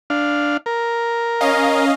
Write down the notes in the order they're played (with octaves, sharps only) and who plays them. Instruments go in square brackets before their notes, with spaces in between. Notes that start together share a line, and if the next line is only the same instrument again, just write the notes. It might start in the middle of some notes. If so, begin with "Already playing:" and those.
[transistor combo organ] D4 F5
A#4
[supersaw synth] C#4 D#5 F5